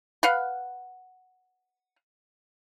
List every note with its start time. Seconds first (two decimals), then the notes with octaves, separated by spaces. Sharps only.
0.23 B4 F5 F#5